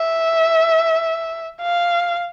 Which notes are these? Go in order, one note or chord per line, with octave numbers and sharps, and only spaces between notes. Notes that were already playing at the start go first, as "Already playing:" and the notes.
Already playing: E5
F5